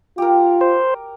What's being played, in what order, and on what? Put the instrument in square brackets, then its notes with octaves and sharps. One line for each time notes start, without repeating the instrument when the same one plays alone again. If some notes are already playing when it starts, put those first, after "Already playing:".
[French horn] F4 [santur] G4 A#4
[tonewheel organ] C5